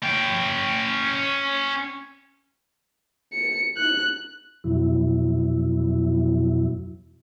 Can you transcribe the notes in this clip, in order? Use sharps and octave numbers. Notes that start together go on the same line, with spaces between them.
C#4 G5
C#7
F#6
F2 B2 F#3 E4